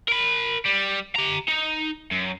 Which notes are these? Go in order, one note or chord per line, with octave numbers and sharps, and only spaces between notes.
A#4 B5
G3
G4 A#5
D#4
F#2